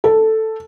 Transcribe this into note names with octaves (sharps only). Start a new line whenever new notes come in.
A4